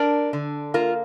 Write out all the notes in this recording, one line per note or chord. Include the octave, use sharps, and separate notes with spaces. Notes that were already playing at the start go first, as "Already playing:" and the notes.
Already playing: D4 A#4 D5
D3
A#3 F4 A#4